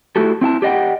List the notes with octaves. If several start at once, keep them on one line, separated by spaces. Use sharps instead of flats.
A3 E4 F#4 G4 A4
C4 E4 G5 A5
G4 D5 D#5 F#5 G5